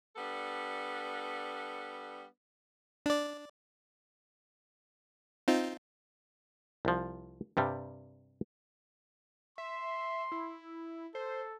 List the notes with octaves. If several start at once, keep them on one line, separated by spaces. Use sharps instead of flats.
G3 B3 D4 A4
D4 D5
C4 D#4 F4
C2 F3
G2 C3 G3
E5 C6
E4
A4 C5